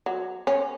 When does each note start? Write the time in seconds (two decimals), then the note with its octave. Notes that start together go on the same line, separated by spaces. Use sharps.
0.06 F#3
0.47 C#4